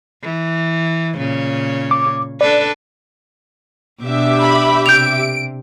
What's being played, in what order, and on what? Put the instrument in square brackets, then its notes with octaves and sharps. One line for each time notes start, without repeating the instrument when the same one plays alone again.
[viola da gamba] E3
A#2 C#3 C#5
[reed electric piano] D6
[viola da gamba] D4 A4 B4 [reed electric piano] D5
[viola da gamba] B2 D4 [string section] G4 E5 D6
[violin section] B5
[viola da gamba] C3 [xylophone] G6 F7 [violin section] D7